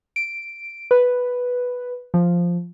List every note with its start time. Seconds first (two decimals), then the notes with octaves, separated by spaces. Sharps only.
0.16 D7
0.91 B4
2.14 F3